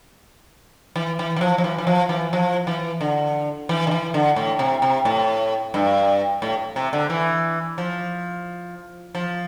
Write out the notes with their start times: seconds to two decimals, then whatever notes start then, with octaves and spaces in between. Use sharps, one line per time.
0.96 E3
1.19 E3
1.36 E3
1.41 F3
1.58 F3
1.64 E3
1.78 E3
1.87 F3
2.09 E3
2.33 F3
2.67 E3
3.01 D3
3.69 E3
3.87 D3
3.91 E3
4.14 D3
4.36 A2
4.59 C3
4.82 C3
5.05 A2
5.74 G2
6.42 A2
6.76 C3
6.93 D3
7.10 E3
7.78 F3
9.15 F3